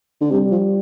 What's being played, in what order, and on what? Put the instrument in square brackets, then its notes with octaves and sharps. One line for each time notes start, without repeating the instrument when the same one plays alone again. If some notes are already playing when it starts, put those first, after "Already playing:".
[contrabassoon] D3
[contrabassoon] C3 [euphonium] G3
[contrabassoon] F3